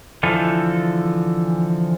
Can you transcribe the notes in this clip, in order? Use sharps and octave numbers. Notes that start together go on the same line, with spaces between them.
D3 E3 F3 A4